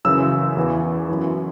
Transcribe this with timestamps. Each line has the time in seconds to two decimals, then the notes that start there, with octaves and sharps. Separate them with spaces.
0.05 F#2 C#3 E3 E6
0.57 E2 E3
1.09 F#2 E3